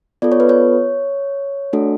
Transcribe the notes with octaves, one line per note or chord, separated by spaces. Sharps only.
B3 F4 A4 D5
C#5
B4
C#5
A3 D4 F#4 A4